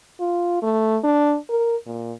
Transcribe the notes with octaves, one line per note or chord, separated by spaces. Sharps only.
F4
A3
D4
A#4
A#2